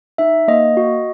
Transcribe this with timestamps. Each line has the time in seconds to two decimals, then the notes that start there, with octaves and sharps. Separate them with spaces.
0.18 D#4 E5
0.48 A#3 D#5
0.77 F#4